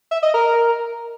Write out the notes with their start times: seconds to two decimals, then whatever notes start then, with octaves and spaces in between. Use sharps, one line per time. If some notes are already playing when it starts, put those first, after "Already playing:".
0.11 E5
0.23 D#5
0.34 A#4